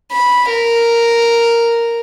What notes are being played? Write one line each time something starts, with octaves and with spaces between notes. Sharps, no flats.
B5
A#4